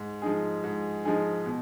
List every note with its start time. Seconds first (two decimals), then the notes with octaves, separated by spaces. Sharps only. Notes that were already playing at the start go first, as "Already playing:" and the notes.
Already playing: G#2
0.22 F3 G#3 D#4 G#4
0.64 G#2
1.05 F3 G#3 D#4 G#4
1.46 B2